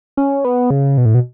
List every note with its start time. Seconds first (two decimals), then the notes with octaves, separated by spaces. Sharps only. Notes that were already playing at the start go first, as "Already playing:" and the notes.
0.17 C#4
0.45 B3
0.70 C#3
0.98 B2
1.06 A2
1.15 B2